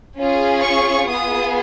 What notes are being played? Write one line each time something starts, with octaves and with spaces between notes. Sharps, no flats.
C#4 F4 G#4
C#6
B3 F4 G#4 D#6